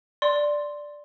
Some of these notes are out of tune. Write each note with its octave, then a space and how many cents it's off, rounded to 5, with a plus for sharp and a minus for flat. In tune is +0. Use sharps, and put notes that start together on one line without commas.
D5 +0 C6 +0